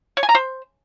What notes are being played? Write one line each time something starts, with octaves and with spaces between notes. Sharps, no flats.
C#5
G#5
A#5
C5